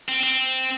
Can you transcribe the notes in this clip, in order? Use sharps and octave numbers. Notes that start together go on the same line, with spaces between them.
C4
C4